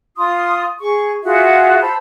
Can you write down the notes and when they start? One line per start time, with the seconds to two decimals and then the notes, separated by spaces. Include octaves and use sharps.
0.17 F4 C6 D#6
0.81 G#4 C#6
1.24 F4 F#4 G#4 E5
1.81 C5 A5 B5 E6